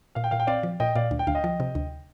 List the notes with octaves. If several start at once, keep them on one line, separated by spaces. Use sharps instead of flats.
A#2 F5
G5
A#2 F5
G5
C4 D5 F5
F3
A#2 D#5 G5
A#2 D5 F5
D2
G5
D2 F5
D#5 G5
F3
C3
D2